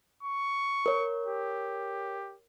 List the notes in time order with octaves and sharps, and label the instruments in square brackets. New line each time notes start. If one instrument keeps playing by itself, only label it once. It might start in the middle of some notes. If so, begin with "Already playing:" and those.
[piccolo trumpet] C#6
[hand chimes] A#4 C#5
[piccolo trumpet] G4